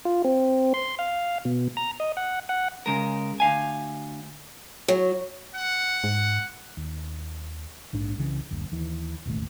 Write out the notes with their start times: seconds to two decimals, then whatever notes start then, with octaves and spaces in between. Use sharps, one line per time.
0.05 F4
0.24 C4
0.74 C6
0.99 F5
1.45 B2
1.77 A#5
2.00 D#5
2.17 F#5
2.49 F#5
2.86 C#3 G#3 A#4
3.40 D2 F5 G#5
4.88 F#3
5.55 F#5
6.04 G#2
6.77 D#2
7.93 A#1 G#2 D4
8.18 C2 C#3 E3
8.51 F#1 D2
8.72 D#2 E3
9.26 E1 A1 D#2 A3